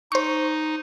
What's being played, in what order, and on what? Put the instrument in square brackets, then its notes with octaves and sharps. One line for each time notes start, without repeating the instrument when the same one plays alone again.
[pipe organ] D#4 [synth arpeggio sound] C5 C#6